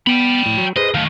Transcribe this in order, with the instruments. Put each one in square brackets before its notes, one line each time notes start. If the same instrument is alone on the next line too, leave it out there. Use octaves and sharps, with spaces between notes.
[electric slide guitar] B3 [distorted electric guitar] G5 B5
[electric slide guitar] A2
F#3
[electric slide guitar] G#4 B4 C5 [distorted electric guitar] D#5
[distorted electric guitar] D#3 A3 [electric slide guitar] F5